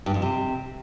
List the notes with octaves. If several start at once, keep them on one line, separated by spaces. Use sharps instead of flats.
G2
F2
C3